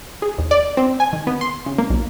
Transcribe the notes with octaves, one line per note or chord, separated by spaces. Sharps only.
G#4
D#2
D5
C4
G#5
D#3
B3
C6
C#3
A#3
B1